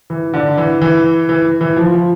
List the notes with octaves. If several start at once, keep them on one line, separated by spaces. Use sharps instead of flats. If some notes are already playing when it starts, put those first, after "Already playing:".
E3
D3
E3
E3
E3
E3
F3
F3